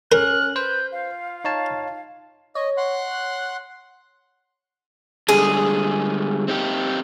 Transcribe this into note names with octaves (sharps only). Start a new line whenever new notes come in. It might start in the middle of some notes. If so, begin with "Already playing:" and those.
C#4 A#4 F6 F#6
B4 C5 G6
F4 F5
D#4 C#5 A5
C#5 D#5
F#5 C6 F#6
D3 G3 G#3 G#4
C4 D#4 G4